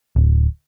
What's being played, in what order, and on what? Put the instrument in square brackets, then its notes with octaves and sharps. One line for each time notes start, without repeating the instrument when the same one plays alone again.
[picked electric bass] D1